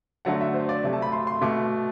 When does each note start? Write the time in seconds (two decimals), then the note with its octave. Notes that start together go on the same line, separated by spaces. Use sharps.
0.25 D3 F#3 A3 F#5
0.41 E5
0.54 C5
0.69 D5
0.84 C3 F#3 A3
0.93 A5
1.02 B5
1.12 C6
1.27 C6
1.41 B2 A3 D6